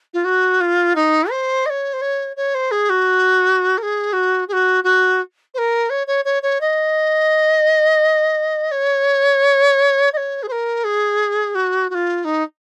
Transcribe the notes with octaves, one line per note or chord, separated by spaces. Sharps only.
F4
F#4
F4
D#4
C5
D#5
C#5
C5
C#5
C#5
C5
G#4
F#4
A#4
G#4
F#4
G#4
F#4
F#4
C5
A#4
C#5
C#5
C#5
C#5
D#5
C#5
D#5
C#5
G#4
C5
A#4
G#4
F#4
F#4
F4
D#4